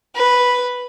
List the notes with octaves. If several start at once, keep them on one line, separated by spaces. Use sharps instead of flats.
B4